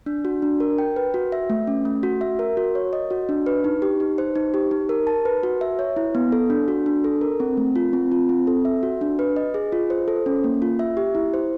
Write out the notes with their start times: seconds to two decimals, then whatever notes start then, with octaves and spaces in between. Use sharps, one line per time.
0.06 D4
0.25 F#4
0.42 D4
0.60 A#4
0.78 G5
0.96 B4
1.14 F#4
1.32 E5
1.50 A3
1.67 C#4
1.85 A3
2.03 F#4
2.21 E5
2.39 A#4
2.57 F#4
2.75 C#5
2.93 D#5
3.10 F#4
3.29 D4
3.46 B4
3.64 D#4
3.82 G4
4.00 D#4
4.18 C5
4.35 D#4
4.54 G4
4.71 D#4
4.89 A#4
5.07 A5
5.25 B4
5.43 F#4
5.61 E5
5.79 C#5
5.96 E4
6.15 B3
6.32 A4
6.50 D4
6.68 F#4
6.86 D4
7.04 A4
7.21 A#4
7.40 C4
7.57 A3
7.76 F4
7.93 C4
8.12 F4
8.29 C4
8.47 A4
8.65 E5
8.83 F#4
9.01 D4
9.19 B4
9.36 D#5
9.54 G#4
9.72 F4
9.90 C5
10.08 A4
10.26 C#4
10.44 A#3
10.62 F4
10.79 E5
10.97 G4
11.15 E4
11.34 C5